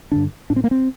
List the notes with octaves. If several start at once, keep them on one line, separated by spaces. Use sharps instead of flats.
G2 D3 D4
A2 D4
C4
A#3
C4